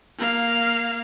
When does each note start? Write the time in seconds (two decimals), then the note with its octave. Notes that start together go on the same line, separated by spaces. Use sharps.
0.18 A#3 F5